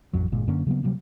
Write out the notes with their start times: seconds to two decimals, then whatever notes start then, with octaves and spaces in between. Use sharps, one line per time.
0.13 A1 F2 F#3
0.32 G1 A#2 G#3
0.47 F#2 D3 A#3 C#4
0.67 C#3 F#3 A#3 B3
0.83 C3 F#3 G3 A#3